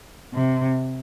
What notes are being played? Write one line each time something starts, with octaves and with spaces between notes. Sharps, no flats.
C3